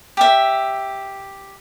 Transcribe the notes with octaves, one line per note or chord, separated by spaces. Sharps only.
G4 E5